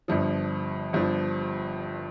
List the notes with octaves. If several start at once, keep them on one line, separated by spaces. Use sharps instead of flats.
G1 G2 F3
G1 G2 F3